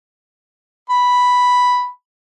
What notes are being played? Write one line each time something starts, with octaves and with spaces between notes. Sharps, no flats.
B5